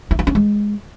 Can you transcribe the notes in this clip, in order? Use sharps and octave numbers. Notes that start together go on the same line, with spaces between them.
E4
F4
C#4
G#3